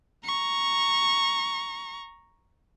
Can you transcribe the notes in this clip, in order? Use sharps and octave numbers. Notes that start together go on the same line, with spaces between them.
A#5 C#6